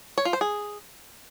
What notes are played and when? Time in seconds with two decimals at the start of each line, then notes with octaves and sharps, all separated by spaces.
0.18 C#5
0.25 F4
0.33 C5
0.41 G#4